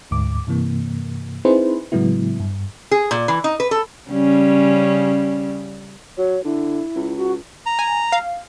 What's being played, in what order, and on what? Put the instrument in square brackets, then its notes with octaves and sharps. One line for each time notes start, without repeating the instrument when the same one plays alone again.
[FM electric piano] D2 G#2 D6
G2 C3 E3 A#3
C4 D#4 E4 G#4 B4 C5
A2 C#3 F#3 G#3 B3 E4
G2
[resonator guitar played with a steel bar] G#4
A#2
E3
D#4
B4
A4
[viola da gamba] C#3 G3 C#4
[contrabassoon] F#3 [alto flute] C#5
[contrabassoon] D3 [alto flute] E4
[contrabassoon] C#2
[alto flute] F#4
[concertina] A#5
[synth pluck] G#5
F5